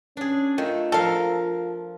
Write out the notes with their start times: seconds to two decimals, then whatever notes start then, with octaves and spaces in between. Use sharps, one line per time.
0.17 C#4 D4 G#4
0.58 D#3 A3 F4
0.92 F3 A4 A#4 F5